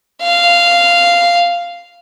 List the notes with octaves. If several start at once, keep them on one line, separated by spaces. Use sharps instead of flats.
F5